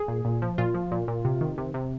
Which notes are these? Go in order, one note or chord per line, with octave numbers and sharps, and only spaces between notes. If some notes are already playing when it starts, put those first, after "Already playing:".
Already playing: G#4
A#2
A#2
F3
A#2 F4
F3
A#2
A#2
C3
D#3
C3
C3